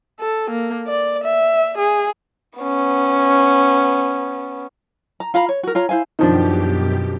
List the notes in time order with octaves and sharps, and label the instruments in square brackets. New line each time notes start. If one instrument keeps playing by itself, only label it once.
[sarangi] A4
A#3
D5
E5
G#4
[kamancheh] B3 C#4
[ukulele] A#5
F4 F5 A#5 B5
C#5
F#4 A#4
F4 C#5 A#5
E4 C5 F5 G#5
[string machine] F#2 B2 G4 [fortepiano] D#3 F3 D4